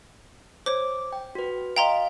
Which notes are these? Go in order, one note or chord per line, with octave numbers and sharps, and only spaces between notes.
C5 C#5 D6
G5
F#4 B4
D#5 F5 G5 A#5 C6